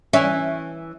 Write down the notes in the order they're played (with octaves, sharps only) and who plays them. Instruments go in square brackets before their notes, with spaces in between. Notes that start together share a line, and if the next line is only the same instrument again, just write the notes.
[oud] E3 C#4 [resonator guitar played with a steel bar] E5 G#5